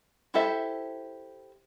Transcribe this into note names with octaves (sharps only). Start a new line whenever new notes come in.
E4 G4 A4 C5 E5